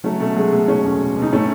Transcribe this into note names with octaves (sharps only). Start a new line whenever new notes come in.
F#3 A3 C#4
B2 A3
F#3 G#3
B2 A3
B2 A3 C#4
E2
B2
B2
D#4
A2 A3 C#4